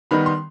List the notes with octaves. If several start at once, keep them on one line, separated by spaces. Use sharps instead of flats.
D#3 G3 B3 D#4 B5
C6